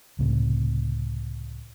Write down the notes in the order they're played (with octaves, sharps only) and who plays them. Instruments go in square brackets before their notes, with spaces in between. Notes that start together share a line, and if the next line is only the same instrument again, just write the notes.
[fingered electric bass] C#2 A2 C3